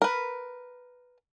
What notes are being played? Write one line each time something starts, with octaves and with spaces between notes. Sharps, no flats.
A#4 B4